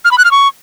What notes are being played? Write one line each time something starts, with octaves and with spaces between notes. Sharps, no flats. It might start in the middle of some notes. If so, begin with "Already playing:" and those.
F6
B5
F#6
F6
C#6